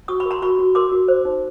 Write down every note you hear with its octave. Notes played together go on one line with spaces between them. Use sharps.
F#4 C#6 D#6
B5 C#6
A#4
A#5 C6
F#4 B5 C#6
F#4
A#4 C6 D6
F#4
C5
D#4